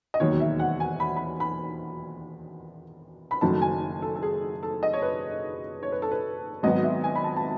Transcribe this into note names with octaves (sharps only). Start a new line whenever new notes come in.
D#5
E1 D#2 D#3 F#3 C#5
E5
F#5
G#5
B5
B5
B5
B5
F#1 F#2 D#3 F#3 A3 A5
G#5
A4
A4
G#4
A4
D#5
C#5
B4
C#5
B4
A4
B4
G#1 G#2 F#3 B3 D#5
E5
G#5
B5
A5
A5